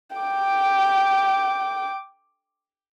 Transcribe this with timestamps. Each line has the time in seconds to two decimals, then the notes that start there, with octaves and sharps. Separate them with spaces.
0.16 G5 D6